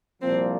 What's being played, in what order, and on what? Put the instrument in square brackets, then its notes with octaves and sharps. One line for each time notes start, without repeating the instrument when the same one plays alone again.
[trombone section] C2 A#2 F3 A#3 [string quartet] C4